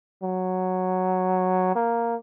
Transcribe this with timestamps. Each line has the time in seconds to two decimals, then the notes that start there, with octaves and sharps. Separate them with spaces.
0.23 F#3
1.75 A#3